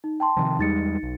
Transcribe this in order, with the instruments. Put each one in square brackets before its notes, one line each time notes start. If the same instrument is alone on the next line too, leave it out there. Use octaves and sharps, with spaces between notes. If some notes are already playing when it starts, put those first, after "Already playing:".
[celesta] D#4
G5 A5 C6
[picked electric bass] C3 D#3 F3
[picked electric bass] E2 G3 G#3 [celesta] D#4 A6 C#7
[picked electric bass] B1